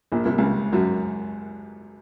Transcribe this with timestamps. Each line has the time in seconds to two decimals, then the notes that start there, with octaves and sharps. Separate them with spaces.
0.12 A#1 A#2
0.25 C2 C3
0.38 C#2 C#3
0.73 F#2 F#3